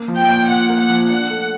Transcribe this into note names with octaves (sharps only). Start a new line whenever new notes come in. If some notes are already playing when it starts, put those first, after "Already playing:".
Already playing: A#3
F3
G5
A#2
A#2 F#5
A#3
F#5
F3
D4 F#5
A3